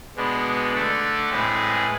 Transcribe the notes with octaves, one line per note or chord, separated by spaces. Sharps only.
B2 G#3 B3 D4
D3 A3 D4 A4
A2 G#3 C4 G#4 B4